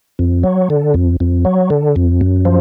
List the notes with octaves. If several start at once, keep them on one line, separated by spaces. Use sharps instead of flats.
F2
F#3
D3
F2
F2
F#3
D3
F2
F#2
F3